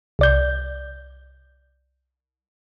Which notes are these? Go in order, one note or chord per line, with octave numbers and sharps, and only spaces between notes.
C2 D5 G6